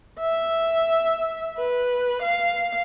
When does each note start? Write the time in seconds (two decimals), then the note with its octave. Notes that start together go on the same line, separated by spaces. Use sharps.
0.20 E5
1.58 B4
2.23 F5